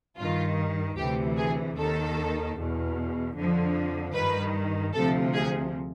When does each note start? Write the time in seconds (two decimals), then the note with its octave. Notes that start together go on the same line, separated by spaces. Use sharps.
0.18 G2 D#3 F4
0.97 D2 C3 E3 G4
1.37 G#4
1.77 D#2 D#3 A4
2.57 E2 B2
3.36 F2 D3 F3
4.14 G2 D#3 B4
4.93 D2 C3 F3 A4
5.34 G#4